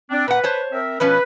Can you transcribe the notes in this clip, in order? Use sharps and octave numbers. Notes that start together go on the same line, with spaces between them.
C4 D4
A#2 B4 F#5
C5 C#5 A5
C4 A#4 E5
B2 F3 C#4 B4